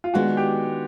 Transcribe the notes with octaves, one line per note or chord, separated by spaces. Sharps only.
F4
D#3 G#3 B3 D4 F#4
G4